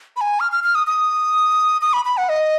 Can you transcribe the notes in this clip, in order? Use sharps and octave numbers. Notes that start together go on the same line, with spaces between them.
B5
G#5
F6
F6
F6
D#6
D#6
D#6
B5
B5
F#5
D#5